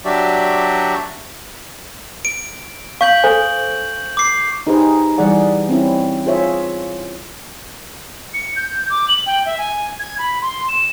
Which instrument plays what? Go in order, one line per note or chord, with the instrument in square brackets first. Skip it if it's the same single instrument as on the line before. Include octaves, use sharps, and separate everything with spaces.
[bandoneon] F#3 D4 F#4 G4 D5 E5
[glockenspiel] D7
[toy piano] F5 [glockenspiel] C#6 G6 F#7
[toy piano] A4 C5 G#5
[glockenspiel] D6 C7
[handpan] D#4 G4 G#4 B4 C5
E3 G3 G#4 D5 F#5
C4 C#4 E4
F4 G#4 C5 C#5 E5
[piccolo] C#7
G6
D6
F#7
G5
E5
G#5
G#6
B5
C6
E7